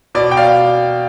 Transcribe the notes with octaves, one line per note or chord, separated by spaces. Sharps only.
B2 D5
G5
D5 F5